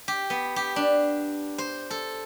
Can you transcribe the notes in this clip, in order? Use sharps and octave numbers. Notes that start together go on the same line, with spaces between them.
G4
B3
G4
D4
C5
A4